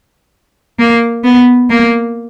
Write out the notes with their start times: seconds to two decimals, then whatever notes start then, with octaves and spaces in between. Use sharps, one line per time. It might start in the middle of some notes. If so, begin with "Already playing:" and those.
0.79 A#3
1.24 B3
1.70 A#3